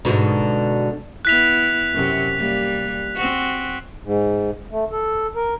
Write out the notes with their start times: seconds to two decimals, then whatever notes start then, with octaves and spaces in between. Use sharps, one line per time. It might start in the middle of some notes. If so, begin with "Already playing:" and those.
0.05 G#2 B2 D3
1.25 B3 E4 F#6 B6 F7
1.94 F#2 C3
2.37 G3 A#3
3.15 C4 F#4
4.04 G#2
4.71 A3
4.92 A4
5.35 A#4